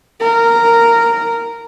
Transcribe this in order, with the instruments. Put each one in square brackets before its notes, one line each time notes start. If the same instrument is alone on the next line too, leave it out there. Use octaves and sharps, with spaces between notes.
[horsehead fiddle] A#4